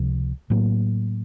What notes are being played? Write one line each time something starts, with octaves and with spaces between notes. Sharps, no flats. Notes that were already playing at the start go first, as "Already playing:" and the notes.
Already playing: C#2 C3 F3
A2 F#3 A#3